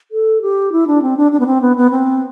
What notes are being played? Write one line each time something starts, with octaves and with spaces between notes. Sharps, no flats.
A4
G4
E4
D4
C4
D4
D4
B3
C4
B3
B3
C4